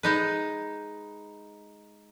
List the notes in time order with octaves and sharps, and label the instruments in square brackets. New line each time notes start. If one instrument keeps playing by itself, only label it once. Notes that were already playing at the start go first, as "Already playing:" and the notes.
[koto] G#3 D#4 B4